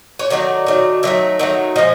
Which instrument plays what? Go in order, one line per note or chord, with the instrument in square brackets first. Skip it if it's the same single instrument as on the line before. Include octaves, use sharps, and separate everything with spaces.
[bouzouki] C#5
D#3 F#3 A3 D5
D#3 F#3 A3
D#3 F#3 A3 E5
D#3 F#3 A3
F3 G#3 D#5